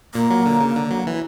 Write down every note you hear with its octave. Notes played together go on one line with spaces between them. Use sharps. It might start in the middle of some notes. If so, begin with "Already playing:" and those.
A#2 A#3
F#3
D3
C#3
D3
F#3
E3